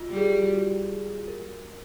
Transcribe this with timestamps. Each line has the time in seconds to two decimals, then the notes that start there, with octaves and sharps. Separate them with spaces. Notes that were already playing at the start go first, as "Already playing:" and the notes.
Already playing: F4 F#4
0.10 G3
0.16 G#4
1.28 A#4